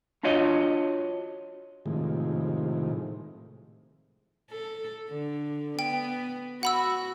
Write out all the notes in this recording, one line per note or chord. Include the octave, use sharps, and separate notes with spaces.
D4 F4 F#4 C#5 D#5
A2 C3 D#3 F3 G#3
A4
D3
B3 G5
F#4 F#5 B5 E6